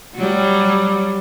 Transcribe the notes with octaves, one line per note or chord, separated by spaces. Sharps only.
F#3 G3